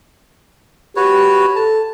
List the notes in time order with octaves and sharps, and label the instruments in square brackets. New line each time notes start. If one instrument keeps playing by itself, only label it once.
[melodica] F#4 B4 C#5 [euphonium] G4
[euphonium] A4 [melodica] A5